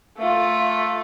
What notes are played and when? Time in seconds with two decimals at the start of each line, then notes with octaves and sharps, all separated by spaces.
0.17 A3 F4